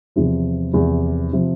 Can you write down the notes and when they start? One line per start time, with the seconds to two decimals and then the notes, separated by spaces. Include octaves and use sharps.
0.16 E2 C3 F3
0.74 E2 C3 F3
1.33 C3 F3